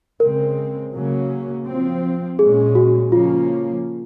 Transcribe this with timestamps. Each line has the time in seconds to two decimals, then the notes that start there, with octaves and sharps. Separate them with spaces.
0.20 C#3 G#3 C4 A#4
0.94 C#3 F#3 A#3 C#4
1.66 F3 C4
2.38 A#2 G#3 C#4 G#4
2.75 F#4
3.12 C#3 F3 A#3 C#4 F4